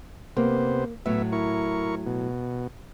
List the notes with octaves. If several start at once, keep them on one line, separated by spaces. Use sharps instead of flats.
C3 A#3 B3 C5
A2 F#3 B3 E5
E4 A#4 C#6
B2